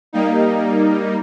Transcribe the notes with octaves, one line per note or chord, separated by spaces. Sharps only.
G3 A#3 D#4